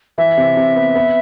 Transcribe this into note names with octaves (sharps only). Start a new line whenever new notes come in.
E3 E5
C3
C3
B3
B3